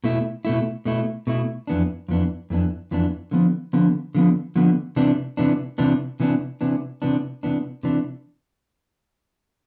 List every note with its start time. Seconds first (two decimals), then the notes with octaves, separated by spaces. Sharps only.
0.04 B2 A3 E4
0.45 B2 A3 E4
0.85 B2 A3 E4
1.27 B2 A3 E4
1.67 F2 E3 B3 D4
2.08 F2 E3 B3 D4
2.50 F2 E3 B3 D4
2.91 F2 E3 B3 D4
3.31 D3 F3 B3
3.73 D3 F3 B3
4.15 D3 F3 B3
4.55 D3 F3 B3
4.96 C3 E3 B3 D4
5.37 C3 E3 B3 D4
5.78 C3 E3 B3 D4
6.20 C3 E3 B3 D4
6.61 C3 E3 B3 D4
7.02 C3 E3 B3 D4
7.43 C3 E3 B3 D4
7.83 C3 E3 B3 D4